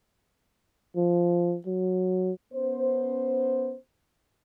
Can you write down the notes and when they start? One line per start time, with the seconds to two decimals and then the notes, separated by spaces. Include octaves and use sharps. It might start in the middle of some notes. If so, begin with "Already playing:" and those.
0.96 F3
1.66 F#3
2.53 B3 C#4 C5